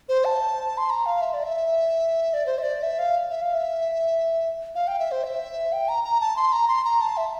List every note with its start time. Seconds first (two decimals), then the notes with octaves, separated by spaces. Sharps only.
0.09 C5
0.25 A5
0.78 C6
0.90 A#5
1.06 F5
1.21 E5
1.34 D5
1.44 E5
2.34 D5
2.46 C5
2.59 E5
2.63 D5
2.83 E5
2.99 F5
3.30 E5
3.42 F5
3.54 E5
4.75 F5
4.88 G5
4.99 E5
5.12 C5
5.24 E5
5.73 G5
5.89 A#5
6.04 A#5
6.21 A5
6.36 C6
6.53 A#5
6.68 C6
6.84 A#5
7.01 A5
7.17 E5